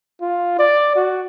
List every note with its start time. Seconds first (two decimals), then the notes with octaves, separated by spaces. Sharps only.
0.21 F4
0.59 D5
0.96 F#4